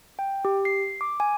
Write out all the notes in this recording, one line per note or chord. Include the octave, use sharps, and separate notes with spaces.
G5
G4
C7
D6
G#5